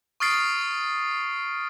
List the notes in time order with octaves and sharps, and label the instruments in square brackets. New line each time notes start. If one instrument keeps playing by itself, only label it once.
[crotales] C#6 D#6 F6 A6 C7 D7